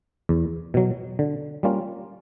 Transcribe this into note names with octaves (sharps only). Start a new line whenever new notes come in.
E2
B2 F#3
D3
G3 A#3 C#4 F4